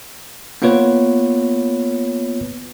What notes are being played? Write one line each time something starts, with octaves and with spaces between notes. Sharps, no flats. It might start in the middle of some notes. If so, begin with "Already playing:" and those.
A#3 B3 F4 B4 C#5